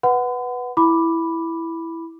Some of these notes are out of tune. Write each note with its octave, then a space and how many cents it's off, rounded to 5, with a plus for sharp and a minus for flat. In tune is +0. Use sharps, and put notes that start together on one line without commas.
B4 +0 F#5 +0 B5 +45
E4 +0 B5 +0 D6 +0